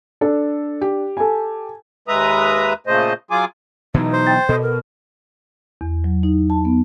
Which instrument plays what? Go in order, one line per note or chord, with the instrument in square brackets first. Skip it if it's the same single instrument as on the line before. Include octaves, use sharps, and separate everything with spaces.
[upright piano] D4 [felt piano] A4
[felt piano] G4
[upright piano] A4 G#5
[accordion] D#2 G#3 B4 E5 A#5 D#6
A#2 C#3 A3 C5 D#5
F#3 F4 G#4 G#5 D6
[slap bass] B2 E3 F#3 [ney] D#4
[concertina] C5
[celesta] G5 A6
[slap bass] B2 [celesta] A4 [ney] D#5
[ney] A#4
[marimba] E2
F#3
D#4
A5
B3